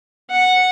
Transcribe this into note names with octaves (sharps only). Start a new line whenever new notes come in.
F#5